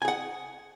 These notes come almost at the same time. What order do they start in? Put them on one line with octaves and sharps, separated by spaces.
G#5 G#4 F#5